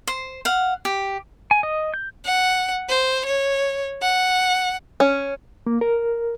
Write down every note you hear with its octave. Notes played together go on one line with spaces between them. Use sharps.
C5
F5 F#5
G4
G#5
D#5
G6
F#5
C5
C#5
F#5
C#4
A#3
A#4